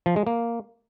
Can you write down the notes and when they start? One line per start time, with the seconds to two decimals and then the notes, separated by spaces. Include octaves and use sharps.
0.06 F3
0.16 G#3
0.27 A#3